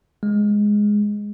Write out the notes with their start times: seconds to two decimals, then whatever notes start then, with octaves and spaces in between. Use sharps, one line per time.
0.23 G#3